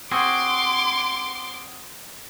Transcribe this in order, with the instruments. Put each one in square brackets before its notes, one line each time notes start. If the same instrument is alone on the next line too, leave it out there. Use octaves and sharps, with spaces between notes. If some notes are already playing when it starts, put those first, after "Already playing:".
[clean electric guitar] C4 F#4 G#4 [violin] C6 D6